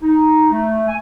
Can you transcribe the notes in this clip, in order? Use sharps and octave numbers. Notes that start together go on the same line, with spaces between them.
D#4
A3
G#5